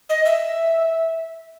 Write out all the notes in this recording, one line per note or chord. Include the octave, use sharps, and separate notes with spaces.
D#5
E5